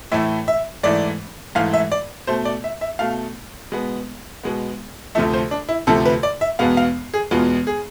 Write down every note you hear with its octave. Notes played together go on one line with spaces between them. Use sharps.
A2 E3 A3 E5
E5
G#2 E3 A3 D5
G#2 E3 A3 F5
E5
D5
B2 A3 C5
D5
E5
E5
B2 A3 F5
B2 G#3 B3
B2 G#3 B3
D2 C3 F3 A3 E5
C5
D4
E4
D2 C3 F3 A3 A4
B4
D5
E5
E2 B2 G#3 B3 F5
F5
G#4
E2 B2 G#3 B3 F4
G#4